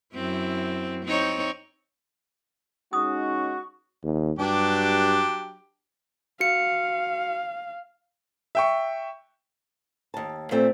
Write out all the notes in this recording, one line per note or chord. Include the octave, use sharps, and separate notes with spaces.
F#2 C4 E4
C4 D#4 C#5
G#3 C#4 D#4 F#4 C#6 D#6
D#2
G2 F#3 D4 G4
F#4 F5 C#7
E5 G5 C#6
D#2 A5
A#2 A3 C4